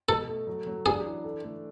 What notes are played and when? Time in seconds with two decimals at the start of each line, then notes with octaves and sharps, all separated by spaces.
0.09 B2 A4
0.27 A3
0.47 F#3
0.66 F#3
0.86 D4 G#4
1.06 E3
1.24 A4
1.43 A3